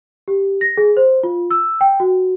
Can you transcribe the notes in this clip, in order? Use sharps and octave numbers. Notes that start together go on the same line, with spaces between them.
G4
A#6
G#4
C5
F4
E6
G5
F#4